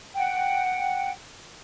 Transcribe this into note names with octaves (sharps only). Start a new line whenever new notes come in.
F#5 G5